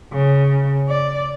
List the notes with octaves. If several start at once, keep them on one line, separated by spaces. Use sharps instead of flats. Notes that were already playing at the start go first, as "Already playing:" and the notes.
C#3
D5